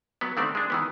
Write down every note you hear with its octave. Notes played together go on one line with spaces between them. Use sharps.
F#3 B3
D3 D#3 A3 C4 D5
G#3 D4
D#3 E3 B3